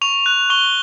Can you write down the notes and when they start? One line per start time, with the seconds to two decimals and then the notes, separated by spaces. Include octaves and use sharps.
0.01 C#6 F7
0.26 F#6
0.50 C#6 G7